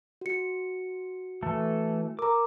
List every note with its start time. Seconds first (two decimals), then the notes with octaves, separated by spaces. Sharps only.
0.21 F#4 C#7
1.42 E3 A3 A4
2.19 A#4 A#5 D6